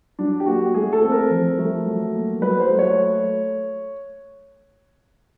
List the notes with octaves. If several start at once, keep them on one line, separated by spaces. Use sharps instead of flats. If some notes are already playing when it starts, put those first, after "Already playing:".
F#3 D4
G4
A#3 F#4
A3 G#4
A4
C4
A#4
F3
A3
F#3
A#3
F#3 B4
C5
A3
C#5